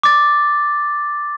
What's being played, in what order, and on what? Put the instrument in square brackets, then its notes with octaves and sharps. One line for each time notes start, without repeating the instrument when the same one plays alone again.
[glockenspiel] D6 A6